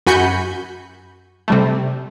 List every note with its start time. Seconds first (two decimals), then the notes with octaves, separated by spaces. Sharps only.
0.06 F#2 F#4 G#5 B5 G6 C#7
1.48 C3 G3 A3